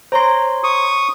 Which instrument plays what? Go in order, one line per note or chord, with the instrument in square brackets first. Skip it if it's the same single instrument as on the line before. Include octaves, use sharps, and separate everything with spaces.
[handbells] C5 C#5 C6 [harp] A#5 A#6
[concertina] C#6 D#6